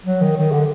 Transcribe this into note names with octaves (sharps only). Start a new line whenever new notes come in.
F#3
D#3
D#3
D3